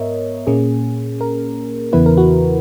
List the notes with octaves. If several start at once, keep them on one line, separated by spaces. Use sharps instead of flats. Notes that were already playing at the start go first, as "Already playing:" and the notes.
Already playing: G#2 B3 A#4 C#5 D#5 E5
A#2 A#3 C#4 G#4
A#4
E2 C#3 E3 B3 E4 B4
A#4
F#4